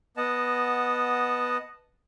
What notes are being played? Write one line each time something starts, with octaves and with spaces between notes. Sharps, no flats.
B3 D#5 F#5 A5